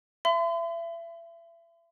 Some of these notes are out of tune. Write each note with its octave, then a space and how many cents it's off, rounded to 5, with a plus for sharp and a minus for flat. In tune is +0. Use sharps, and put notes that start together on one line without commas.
E5 +30 C6 -45